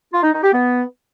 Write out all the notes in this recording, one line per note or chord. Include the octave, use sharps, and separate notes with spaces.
F4
D#4
D#4
G4
B3